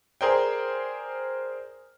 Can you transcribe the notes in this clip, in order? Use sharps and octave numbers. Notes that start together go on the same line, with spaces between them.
G#4 A#4 C5 D5 G5